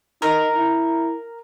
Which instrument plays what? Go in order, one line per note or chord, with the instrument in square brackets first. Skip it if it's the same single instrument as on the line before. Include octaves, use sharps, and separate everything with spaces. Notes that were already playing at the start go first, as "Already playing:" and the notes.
[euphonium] D#4 [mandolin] A#4
[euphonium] E4